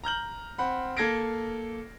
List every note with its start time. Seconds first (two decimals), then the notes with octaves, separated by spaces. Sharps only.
0.04 A#5 F6 G6 F#7
0.58 C4 F#5 B5
0.97 A#3 A4 G#6 A#6 C7 D7